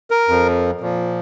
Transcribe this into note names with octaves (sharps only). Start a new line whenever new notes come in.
A#4
F2 F3
A#2 F3